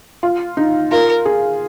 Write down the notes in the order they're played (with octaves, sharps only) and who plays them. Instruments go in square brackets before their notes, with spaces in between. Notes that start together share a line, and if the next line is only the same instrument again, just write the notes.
[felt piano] F4
D#4
[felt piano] F4 [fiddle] A#4
[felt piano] G#4